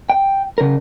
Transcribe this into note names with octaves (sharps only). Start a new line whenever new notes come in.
G5
C#3 A#4